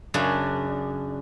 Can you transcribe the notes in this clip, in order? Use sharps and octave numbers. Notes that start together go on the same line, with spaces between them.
F#2 C#3 D4